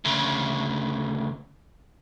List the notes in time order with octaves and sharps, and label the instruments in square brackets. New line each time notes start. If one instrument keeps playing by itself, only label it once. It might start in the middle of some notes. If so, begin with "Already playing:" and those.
[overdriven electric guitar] D2 C#3